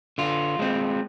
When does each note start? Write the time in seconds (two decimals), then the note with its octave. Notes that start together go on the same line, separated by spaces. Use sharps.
0.18 D3 F4
0.59 G#3 C4